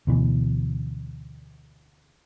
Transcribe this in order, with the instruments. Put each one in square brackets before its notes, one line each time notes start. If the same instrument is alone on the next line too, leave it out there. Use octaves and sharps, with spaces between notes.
[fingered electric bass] D2 B2 E3